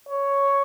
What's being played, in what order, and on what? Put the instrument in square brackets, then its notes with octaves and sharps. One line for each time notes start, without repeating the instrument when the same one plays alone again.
[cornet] C#5